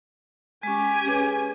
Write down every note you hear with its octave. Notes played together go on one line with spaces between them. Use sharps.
G#3 C#4 G4 G#5
C#4 G#4 B4